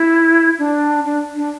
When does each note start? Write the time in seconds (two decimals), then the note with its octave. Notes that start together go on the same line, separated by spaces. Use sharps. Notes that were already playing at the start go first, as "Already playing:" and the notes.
Already playing: E4
0.59 D4
1.05 D4
1.35 D4